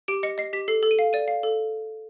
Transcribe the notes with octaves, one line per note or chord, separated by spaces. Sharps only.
G4 D7
D#5 C#7
D#5 C7
G4 B6
A4 C7
A4
D#7
F5
D5 D#7
F5
A4